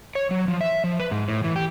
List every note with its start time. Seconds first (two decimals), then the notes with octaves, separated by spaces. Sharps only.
0.15 C#5
0.31 F#3
0.48 F3
0.61 E5
0.84 F3
0.99 B4
1.11 G#2
1.28 A2
1.44 E3
1.56 G4